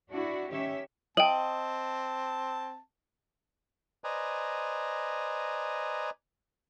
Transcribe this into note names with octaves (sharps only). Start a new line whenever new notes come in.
D4 E4 F#4
D#3 C#4 G4 C#5 E5
C4 D#5 G5 A5 F#7
B4 C5 D5 D#5 G#5 A#5